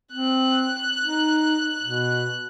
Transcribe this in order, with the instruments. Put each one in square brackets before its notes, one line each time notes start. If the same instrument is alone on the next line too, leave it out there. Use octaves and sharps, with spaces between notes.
[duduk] C4 [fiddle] F#6
[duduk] D#4
B2